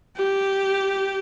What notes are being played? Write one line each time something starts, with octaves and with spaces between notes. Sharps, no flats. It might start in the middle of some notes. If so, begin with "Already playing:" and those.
G4